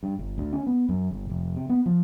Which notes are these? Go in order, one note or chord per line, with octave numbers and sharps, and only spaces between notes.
G2
G1
D2
C#4
B3
F#2
G1
F1
C3
B3
F3